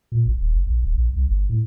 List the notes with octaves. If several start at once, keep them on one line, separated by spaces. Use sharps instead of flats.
A#2
A1
D#1
F#1
A#1
D1
A#1
C2
G1
A2